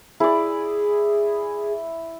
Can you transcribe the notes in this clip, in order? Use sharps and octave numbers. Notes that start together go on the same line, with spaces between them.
E4 G#4 D5